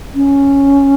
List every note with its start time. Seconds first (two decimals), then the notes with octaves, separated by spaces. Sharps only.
0.15 C#4